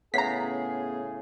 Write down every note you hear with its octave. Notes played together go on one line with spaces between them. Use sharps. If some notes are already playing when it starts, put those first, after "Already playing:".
A2 C#3 B3 G#4 A#5 B6 C7